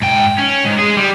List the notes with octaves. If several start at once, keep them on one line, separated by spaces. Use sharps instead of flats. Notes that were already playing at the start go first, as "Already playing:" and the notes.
G#2 G5
C#4
G#2
G#3 G#4
G3